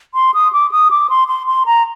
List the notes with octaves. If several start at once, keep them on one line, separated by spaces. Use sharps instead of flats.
C6
D#6
D6
D#6
D6
C6
C6
C6
A#5